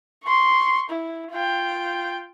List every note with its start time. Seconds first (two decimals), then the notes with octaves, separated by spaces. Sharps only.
0.23 C6 C#6
0.90 E4
1.31 F4 G5